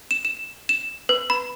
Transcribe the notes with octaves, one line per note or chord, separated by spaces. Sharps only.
E7
E7
E7
B4
B5